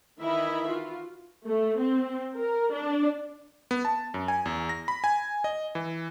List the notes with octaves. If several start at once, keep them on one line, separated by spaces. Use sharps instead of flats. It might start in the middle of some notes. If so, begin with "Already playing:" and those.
D#3 E3 E4 D#5 E5 B5
F4 F#4
A3
C4
A#4
D4
B3
A5
F#2
G#5
E2
A#6
B5
G#5
D#5
E3